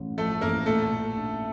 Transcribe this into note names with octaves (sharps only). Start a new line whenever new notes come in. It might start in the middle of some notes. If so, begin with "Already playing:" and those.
Already playing: A1 A2
F3 A3 A4
A1 A#3 A#4
A#2 A3 A4
A#2
D4